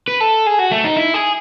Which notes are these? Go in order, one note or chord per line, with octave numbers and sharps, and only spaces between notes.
B4
A4
G#4
F#4
A3
D#4
E4
G#4